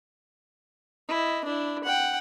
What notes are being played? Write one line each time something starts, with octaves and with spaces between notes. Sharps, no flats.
E4 D#5
D4 E4
F#5 G5